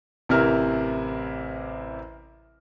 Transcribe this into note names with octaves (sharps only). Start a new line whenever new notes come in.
A1 C3 E3 E4 A#4 F6